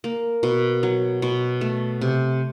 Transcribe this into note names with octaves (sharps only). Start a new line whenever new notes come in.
A#3
B2
F#3
B2
A3
C3